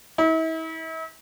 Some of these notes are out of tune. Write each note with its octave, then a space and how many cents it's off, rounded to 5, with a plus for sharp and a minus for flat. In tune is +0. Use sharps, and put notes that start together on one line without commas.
E4 -40